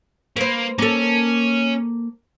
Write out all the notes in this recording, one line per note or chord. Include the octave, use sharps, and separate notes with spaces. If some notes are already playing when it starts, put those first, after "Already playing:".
A#3 B4 C5
A#3 C#4 A4